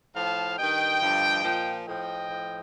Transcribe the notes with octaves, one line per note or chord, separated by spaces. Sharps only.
A2 F3 F5 A5
G2 D#3 D#5 G5
G2 D3 F3
A#2 F3
A2 F3 D#5 G5
A2 F3